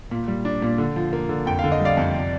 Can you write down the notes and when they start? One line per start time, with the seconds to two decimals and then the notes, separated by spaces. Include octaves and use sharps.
0.11 A#2
0.28 G3
0.45 D4
0.62 A#2
0.78 D3
0.96 F3
1.13 A#3
1.29 D3
1.46 F2 G5
1.59 F5
1.64 D3
1.72 D#5
1.80 G3
1.85 D5 F5
1.97 F2
2.15 C3